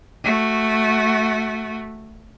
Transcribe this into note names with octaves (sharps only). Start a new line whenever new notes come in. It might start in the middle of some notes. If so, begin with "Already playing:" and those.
A3 F#4